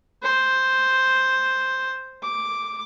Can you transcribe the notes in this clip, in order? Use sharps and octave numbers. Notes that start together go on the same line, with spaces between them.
C5
D6